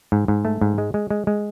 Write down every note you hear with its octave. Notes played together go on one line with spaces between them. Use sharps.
G#2
G#2
A3
G#2
G#3
G#3
G#3
G#3